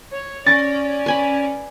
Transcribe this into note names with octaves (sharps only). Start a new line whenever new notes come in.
C#5
C#4 D5 A6 A#6 D7
B4 G#5 B5